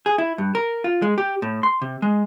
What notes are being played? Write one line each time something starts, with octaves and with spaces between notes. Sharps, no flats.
G#4
E4
G2
A#4
F4
G#3
G4
A2
C6
C3
G#3